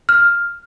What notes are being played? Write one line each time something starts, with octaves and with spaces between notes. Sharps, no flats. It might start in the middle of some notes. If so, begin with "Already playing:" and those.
F6